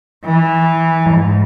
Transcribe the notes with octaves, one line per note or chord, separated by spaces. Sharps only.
E3
G#2